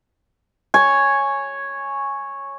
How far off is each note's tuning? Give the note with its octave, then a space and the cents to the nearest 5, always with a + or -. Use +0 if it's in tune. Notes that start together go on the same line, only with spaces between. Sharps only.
C#5 -5 G#5 +0